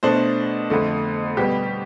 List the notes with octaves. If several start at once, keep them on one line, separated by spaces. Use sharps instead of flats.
B2 A3 D4 C5
F2 D3 A3
B2 G3 B3 G4